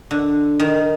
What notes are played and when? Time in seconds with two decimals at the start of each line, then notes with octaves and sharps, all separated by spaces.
0.11 D3
0.60 D#3